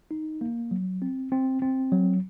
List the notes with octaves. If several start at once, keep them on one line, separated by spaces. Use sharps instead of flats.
D#4
A#3
F#3
C4
C4
C4
F#3